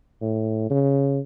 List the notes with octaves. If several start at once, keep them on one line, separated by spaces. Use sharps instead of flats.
A2
C#3